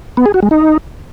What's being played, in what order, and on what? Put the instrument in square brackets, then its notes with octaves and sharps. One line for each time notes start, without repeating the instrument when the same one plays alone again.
[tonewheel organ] B3
G#4
F#4
G#3
D#4